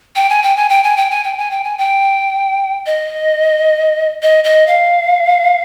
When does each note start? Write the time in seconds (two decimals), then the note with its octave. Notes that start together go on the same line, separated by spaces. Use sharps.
0.16 G5
0.30 G#5
0.43 G5
0.57 G#5
0.69 G5
0.84 G#5
0.97 G5
1.11 G#5
1.24 G5
1.38 G#5
1.51 G5
1.64 G#5
1.78 G5
2.86 D#5
4.22 D#5
4.44 D#5
4.67 F5